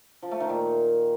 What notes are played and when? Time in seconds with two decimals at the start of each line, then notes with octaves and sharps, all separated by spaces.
0.22 F3
0.31 A3
0.40 D#3
0.49 A#2